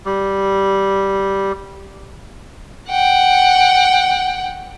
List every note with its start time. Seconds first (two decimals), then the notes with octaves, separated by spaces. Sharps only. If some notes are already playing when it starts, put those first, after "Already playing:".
0.06 G3
2.89 F#5 G5